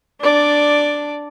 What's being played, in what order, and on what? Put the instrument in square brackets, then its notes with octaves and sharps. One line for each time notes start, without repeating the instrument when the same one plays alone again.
[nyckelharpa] D4 D5